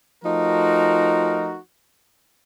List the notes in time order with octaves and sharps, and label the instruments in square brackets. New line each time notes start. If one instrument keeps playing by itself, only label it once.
[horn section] F3 A3 D#4 F#4 A#4